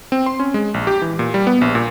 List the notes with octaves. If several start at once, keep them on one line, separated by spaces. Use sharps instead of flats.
C4
C6
C#4
G#3
A#1
G4
E3
A#2
G3
B3
A#1
A#2